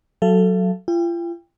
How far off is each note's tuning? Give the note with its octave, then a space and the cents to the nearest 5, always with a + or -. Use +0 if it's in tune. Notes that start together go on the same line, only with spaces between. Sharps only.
F#3 +0 A4 +0 F5 -45
F4 -40 G5 +25